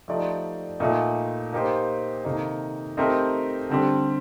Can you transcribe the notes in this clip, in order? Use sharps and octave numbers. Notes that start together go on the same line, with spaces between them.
F3 A3 D#4 G4 D5
A#2 A3 D#4
A#3 D#4 G4 C5
C3 D#3 A#3 D#4 A4
A3 C4 D#4 G4 A#4
D3 G3 C4 G4